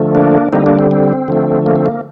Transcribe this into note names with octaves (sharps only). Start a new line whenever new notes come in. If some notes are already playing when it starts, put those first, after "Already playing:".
Already playing: D3 F3 A3
A#3 D4
D3 G3 A#3 C4 D#4
A#3 D4
C4
C4
D3 F3 A3
A#3
C4
A#3